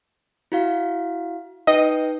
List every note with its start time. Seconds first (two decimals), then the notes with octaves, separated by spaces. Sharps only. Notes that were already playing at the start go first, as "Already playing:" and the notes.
0.52 E4 F#4 F5
1.67 D#4 B4 D#5 G5